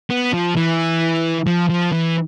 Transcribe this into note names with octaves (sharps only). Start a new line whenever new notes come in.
B3
F3
E3
F3
F3
E3